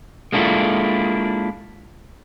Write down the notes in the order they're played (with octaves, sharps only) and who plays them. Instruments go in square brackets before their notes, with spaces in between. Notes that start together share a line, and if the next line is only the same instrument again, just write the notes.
[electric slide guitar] G#3 A#3 D4 E4 F4 A4